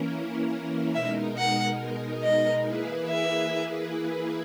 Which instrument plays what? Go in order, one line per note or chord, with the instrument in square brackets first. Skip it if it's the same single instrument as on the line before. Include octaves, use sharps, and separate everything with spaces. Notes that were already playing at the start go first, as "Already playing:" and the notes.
Already playing: [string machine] E3 A#3 C#4 E4 A#4
[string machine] B2 G#3 D#4 A#4 [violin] E5
[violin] F#5
D#5
[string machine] E3 A#3 E4 G#4 B4
[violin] E5